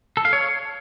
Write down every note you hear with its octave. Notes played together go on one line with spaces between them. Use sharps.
A4
F5
C#5